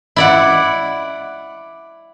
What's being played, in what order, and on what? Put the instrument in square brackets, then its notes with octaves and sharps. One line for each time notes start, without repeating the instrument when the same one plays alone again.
[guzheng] E4 D5 F#5